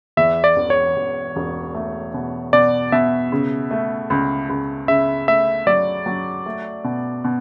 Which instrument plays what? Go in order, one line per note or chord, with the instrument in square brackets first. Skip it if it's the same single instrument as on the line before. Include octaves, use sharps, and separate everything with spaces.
[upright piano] E2 [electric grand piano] E5
[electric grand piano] D5
[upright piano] E1
[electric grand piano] C#5
[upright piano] E1
E1
A3
B2
[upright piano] B2 [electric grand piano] D5
[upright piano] B2 [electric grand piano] E5
[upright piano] C#3
A3
C#2
C#2
[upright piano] C#3 [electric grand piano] E5
[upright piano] A3 [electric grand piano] E5
[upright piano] F#3 [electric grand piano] D5
[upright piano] F#3
A3
B2
B2